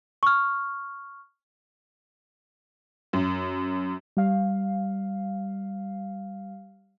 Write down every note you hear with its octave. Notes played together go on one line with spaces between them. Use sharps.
C#6 F6
F#2
G3 F5